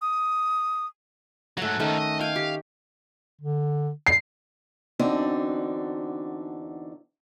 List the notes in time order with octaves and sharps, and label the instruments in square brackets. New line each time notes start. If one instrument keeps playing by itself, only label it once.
[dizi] D#6
[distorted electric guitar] G#2 F#3 [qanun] A3 F#5
[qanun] D#3 A3 C#4 [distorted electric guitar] F3 D#4
[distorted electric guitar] D#5
[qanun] C#5 G5 G#5 [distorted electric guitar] F5
[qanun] G4
[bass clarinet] D3
[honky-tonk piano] C7
[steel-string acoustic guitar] E2 D3 C4 D4 D#4 F#4